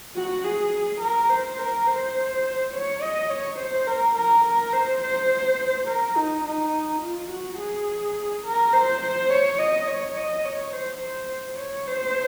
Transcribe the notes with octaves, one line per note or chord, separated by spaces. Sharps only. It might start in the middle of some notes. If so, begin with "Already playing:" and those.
F#4
G#4
A#4
C5
A#4
C5
C#5
D#5
C#5
C5
A#4
A#4
A#4
C5
C5
A#4
D#4
D#4
F4
F#4
G#4
A#4
C5
C5
C#5
D#5
C#5
D#5
C#5
C5
C5
C#5
C5